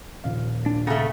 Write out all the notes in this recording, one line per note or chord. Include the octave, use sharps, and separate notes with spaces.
D#1 A#1 F5
D4
C#3 A3 A4 F#5 A#5